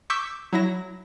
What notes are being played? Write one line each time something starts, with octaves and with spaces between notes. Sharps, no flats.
C#6 D6 E6 G6 B6
F#3 E4 A#6